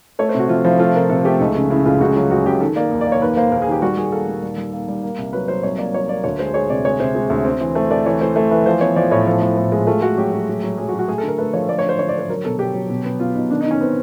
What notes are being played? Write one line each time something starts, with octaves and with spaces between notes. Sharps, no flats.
A3 C#5
C5
C3 F#4
F3 F4
F3 E4
A3 F4
C3 A#4
C3 A4
A3 G4
C#2 D#4
C#3
C#3 E4
C#2 F4
C#2 F#4
F#3 F4
C#2 F#4
C#2 G4
D#3 A4
A#3 D5
D#2
D5
A#3
C#5
D#2 B4
A#3 C5
D#2 A#4
G#4
D#3 G4
G3 F#4
G3 G#4
A#3 A4
G3
G3
G3
A#3
G3
A#3
C2
F#3 B4
F#3 C5
C2 C#5
A#3 D5
F#3 C#5
A#3 D5
D2 C#5
G#3 C5
G#3 C#5
C3 D5
G#3 C#5
C3 C5
G#3
D2
C4
E3
A3 C5
A3 D5
E3 C#5
A3 C5
A3 C5
E3 B4
F3 C5
B3 C#5
F3 D5
A2 C#5
F3 A4
A2
A2
G#3
A3 F4
A3 F#4
F#3 G4
F#3
F#3
F#3
F#3 G#4
F#4
F#3
F#4
A3 G#4
A4
D3 A#4
A3 B4
F3 C#5
A3 D5
C#5
D3 C5
D3 C#5
D5
D3
C5
F#3 A#4
B2 A4
B2 G4
F#3
B2
B3
B3 F4
B2 D#4
D#3 D4
D#4
D#3
C#4
B3 C4